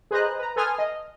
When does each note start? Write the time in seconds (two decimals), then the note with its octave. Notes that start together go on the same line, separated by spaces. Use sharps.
0.11 G#4 B4 C5 D#5 A#5 F#6
0.39 B4 A#5
0.56 A4 B4 G#5 C6 D#6 F6
0.78 D#5